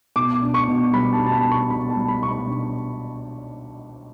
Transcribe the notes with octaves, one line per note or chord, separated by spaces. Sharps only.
B2 D6
D4
C#6
B2
G3 B5
A5
B2
A5
B5
D4
C#6
B2 B5
A5
G3
B5
B2 C#6
B5
D4